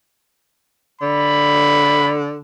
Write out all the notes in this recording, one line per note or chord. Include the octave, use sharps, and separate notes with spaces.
D3 B5